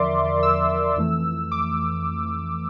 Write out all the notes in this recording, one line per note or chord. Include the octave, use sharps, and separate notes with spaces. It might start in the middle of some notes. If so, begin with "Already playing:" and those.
Already playing: E2 D3 F3 A#4 D5 E5 C6 D6
E6
F2 E3 A3
D6